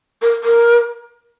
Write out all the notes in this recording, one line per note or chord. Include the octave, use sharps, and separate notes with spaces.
A#4
A#4